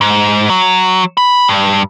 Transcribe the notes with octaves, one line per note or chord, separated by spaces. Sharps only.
G#2
F#3
B5
G2